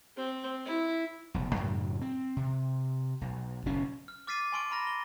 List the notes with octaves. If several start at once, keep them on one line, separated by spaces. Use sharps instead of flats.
C4
E4
F1 B1
F#2 A2 C#3 F#3
C4
C3
B1
F#1 B2 C#4
F6
D6 F6 A6 B6 C7 D#7
A6
G#5 A5 C6 C#6 F6 D7
A#5 B5 F6 A#6
G7